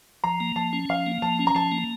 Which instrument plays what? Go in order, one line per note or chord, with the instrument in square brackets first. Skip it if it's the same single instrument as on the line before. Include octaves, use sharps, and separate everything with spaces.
[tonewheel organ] F3 [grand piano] A#5
[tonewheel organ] A#3
[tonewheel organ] F3 [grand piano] A5
[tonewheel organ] C#4
[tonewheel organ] F3 [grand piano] F5
[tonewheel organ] A#3
[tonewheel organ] F3 [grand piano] A5
[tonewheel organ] C#4
[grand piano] A#5
[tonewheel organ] F3 [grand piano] A5
[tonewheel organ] A#3